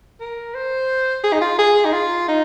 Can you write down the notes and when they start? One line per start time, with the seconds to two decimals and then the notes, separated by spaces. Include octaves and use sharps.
0.21 A#4
0.55 C5
1.24 G#4
1.33 D#4
1.42 F4
1.59 G#4
1.85 D#4
1.93 F4
2.29 D#4